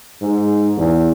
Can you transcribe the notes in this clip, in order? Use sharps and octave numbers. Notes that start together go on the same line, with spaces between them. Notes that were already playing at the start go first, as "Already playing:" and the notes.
G#2
E2